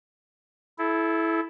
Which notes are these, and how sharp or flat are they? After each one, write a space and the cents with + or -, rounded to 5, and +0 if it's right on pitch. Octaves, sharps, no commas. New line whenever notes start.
E4 +0 A4 -30